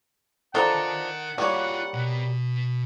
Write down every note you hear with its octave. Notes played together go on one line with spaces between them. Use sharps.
F3 D4 A4 A#4 D#5 F#5 A#5
G3 A#3 F4 F#4 C#5
B2